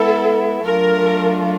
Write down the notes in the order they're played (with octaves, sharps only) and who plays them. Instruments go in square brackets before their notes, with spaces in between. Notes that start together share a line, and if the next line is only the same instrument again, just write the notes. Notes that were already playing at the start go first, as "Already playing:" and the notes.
Already playing: [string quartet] G#3 B3 E4 [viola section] A4
[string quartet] F#3 A3 D4 F4 [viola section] A#4